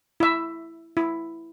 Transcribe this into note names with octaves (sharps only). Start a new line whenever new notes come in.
E4 E5
E4